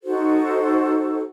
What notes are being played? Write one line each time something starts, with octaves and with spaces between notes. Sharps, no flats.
D#4 F#4 A4 C5